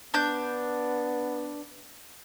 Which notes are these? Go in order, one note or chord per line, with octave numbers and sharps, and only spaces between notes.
B3 D4 G6